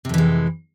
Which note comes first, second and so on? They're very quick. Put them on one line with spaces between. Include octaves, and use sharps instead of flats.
C3 F2 E3 G#3